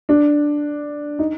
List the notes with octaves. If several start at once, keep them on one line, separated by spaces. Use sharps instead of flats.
D4
D#4